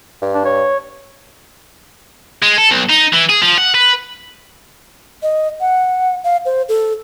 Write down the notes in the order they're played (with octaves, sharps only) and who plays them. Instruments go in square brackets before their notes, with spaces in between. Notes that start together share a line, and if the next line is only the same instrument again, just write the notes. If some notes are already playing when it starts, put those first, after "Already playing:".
[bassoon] G2
[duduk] D4
C#5
[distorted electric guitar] G#3
A4
B1
D#4
E3
G#4
F3
F#5
B4
[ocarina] D#5
F#5
F5
C5
A4